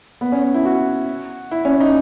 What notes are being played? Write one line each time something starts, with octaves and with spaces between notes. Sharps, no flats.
B3
C#4
E4
F#4
E4
C#4
D#4